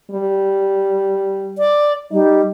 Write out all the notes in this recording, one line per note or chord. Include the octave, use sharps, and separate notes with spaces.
G3
D5
G3 D#4